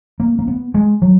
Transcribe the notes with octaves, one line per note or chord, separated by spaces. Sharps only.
A#3
A#3
B3
G#3
F#3